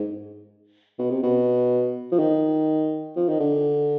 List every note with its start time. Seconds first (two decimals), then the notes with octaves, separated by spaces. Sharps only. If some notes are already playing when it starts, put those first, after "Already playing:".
Already playing: G#2
0.99 B2
1.10 C3
1.23 B2
2.11 F3
2.19 D#3
3.16 F3
3.28 D#3
3.40 D3